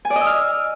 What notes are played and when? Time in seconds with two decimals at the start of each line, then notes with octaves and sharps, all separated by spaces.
0.05 G#5
0.10 D5
0.16 D#5
0.21 E6
0.27 F6